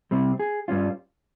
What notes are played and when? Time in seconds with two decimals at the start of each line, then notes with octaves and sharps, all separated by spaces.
0.11 C3 G3 C4
0.40 G#4
0.68 G2 G3 C#4 F4